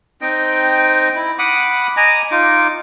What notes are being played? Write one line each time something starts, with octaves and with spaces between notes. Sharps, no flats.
C4 D#4 D#5 G5
E4
F#5 B5 D6 D#6
D#5 G#5 A#5 D6
D#4 F4 D6